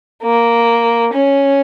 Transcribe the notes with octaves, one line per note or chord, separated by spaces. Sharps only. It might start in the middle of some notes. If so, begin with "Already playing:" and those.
A#3
C#4